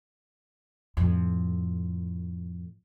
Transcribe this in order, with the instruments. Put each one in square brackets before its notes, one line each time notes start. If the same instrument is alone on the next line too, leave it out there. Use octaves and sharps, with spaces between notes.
[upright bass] F2 A2